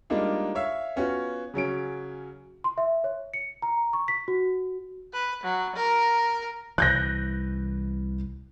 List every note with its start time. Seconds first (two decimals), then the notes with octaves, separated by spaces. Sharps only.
0.10 G3 G#3 A#3 D4 D#4 F4
0.55 C#5 E5 F5
0.96 B3 C#4 F4 F#4
1.54 C#3 F#3 C#4 D7
2.64 C6
2.78 E5
3.04 C#5
3.34 C#7
3.62 A#5
3.93 C#6
4.08 B6
4.28 F#4
5.13 B4
5.43 F#3
5.76 A#4
6.78 C2 E3 F#6 G6 A#6